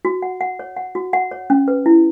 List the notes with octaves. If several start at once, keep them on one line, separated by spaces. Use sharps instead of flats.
F#4
F#5
F#5
C#5
F#5
F#4
F#5
C#5
C#4
B4
E4